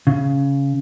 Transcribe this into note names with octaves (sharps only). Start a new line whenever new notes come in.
C#3